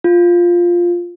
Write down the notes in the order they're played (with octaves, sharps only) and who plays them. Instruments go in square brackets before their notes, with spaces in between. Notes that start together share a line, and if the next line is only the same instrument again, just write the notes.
[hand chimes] F4